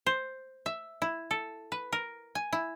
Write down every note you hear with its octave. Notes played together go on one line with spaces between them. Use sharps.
C5
E5
E4
A4
B4
A#4
G#5
E4